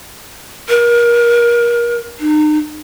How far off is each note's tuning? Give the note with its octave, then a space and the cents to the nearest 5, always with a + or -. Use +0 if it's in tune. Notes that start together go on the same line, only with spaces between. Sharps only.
A#4 +30
D#4 -40